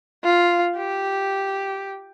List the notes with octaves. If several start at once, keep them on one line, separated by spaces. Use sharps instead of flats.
F4
G4